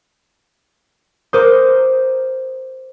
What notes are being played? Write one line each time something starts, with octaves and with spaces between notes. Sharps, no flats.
A#4 C5 D6 D#6